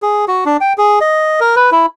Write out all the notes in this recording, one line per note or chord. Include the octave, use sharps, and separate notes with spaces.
G#4
F#4
D4
G5
G#4
D#5
A#4
B4
E4